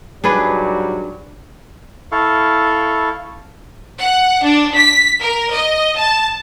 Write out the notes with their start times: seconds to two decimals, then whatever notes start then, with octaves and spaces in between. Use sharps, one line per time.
0.24 G#2 F#3 G3 D4 G#4 B4
2.12 E4 A4 F5 C#6
4.00 F#5
4.43 D4
4.77 B6
5.21 A#4
5.52 D#5
5.97 A5